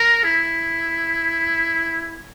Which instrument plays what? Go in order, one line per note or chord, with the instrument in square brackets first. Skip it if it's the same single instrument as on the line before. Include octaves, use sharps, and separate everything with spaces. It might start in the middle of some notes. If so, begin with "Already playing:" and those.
Already playing: [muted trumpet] A#4
E4